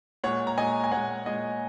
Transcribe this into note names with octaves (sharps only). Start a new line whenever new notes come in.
A#2 G#3 C#5 F#5
A#5
A#2 G#3 D#5 G#5
G#5
A#2 G#3 C#5 F#5
A#2 G#3 D#5